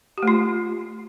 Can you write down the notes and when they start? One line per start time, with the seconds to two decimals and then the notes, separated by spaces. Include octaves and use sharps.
0.18 G4
0.23 A3
0.28 F4